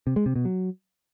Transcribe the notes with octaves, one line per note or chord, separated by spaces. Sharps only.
C3
G#3
C3
B2
F#3